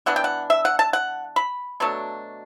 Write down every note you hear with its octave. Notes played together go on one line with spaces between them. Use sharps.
E3 B3 D4 F#5
G5
F#5
E5
F#5
A5
F#5
B5
B2 F#3 A3 D4